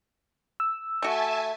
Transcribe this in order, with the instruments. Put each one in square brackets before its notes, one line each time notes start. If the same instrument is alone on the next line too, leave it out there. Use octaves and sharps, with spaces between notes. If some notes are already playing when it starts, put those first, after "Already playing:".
[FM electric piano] E6
[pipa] A3 F#4 [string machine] E5 G#5 A5